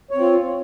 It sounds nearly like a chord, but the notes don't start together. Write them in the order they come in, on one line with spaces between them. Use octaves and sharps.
C#5 C4 F4